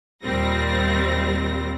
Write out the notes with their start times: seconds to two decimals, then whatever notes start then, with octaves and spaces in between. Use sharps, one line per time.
0.22 D#2 A#2 G3 C4 A#6